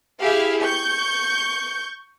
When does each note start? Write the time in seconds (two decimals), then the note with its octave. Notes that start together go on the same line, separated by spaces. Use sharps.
0.22 E4 G4 G#4 E5 F5
0.61 C#6 G6